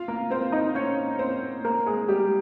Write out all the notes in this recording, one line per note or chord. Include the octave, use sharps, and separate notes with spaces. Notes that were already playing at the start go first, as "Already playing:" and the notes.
Already playing: F4 F5
A#3 A#4
C4 C5
D#4 D#5
C#4 C#5
C4 C5
A#3 A#4
G#3 G#4
G3 G4